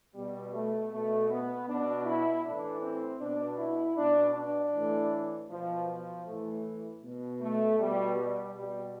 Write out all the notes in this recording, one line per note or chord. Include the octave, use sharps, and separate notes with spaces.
B2 G3
A3
B2 A3
B3
B2 D4
E4
A2 E3 D4
C4
B2 D4
E4
B2 D4
D4
A2 E3
B2 F3
F3
A2 E3 A3
B2
A3
B2 G3
G3
B2 G3